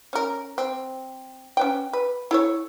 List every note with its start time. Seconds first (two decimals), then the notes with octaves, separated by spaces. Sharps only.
0.13 C#4 A#4
0.58 C4
1.57 C#4 B4 G5
1.93 B4
2.31 E4 A4 C#5